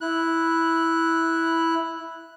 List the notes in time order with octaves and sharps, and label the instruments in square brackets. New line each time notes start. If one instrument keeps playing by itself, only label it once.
[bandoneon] E4 F#6